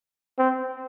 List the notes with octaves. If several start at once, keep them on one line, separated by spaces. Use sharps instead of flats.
C4